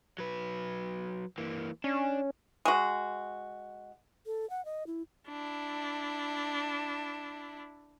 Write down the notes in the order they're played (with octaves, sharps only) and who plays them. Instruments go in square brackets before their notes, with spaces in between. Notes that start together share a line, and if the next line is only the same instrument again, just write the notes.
[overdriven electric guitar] F#3 B4
E3 A#3
[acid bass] C#4 [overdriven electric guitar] D4
[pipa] G#3 F#4
[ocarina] A4
F#5
D#5
E4
[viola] D4 E4